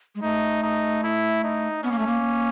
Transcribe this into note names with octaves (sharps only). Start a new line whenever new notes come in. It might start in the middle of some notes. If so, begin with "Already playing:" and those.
G#3
A3 D#4
D#4
E4
D#4
B3 C#4
A#3
A3
A#3